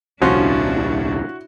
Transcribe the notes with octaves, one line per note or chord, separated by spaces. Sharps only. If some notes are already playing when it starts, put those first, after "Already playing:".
D#1 C2 F3 C#4 D4 E4 F#4 C5